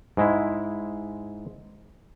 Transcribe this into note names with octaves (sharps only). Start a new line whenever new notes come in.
G#2 G#3 E4